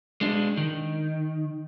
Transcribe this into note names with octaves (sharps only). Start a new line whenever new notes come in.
G#3 D4
D#3